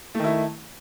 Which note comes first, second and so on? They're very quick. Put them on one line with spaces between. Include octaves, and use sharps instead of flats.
A3 D#3 E4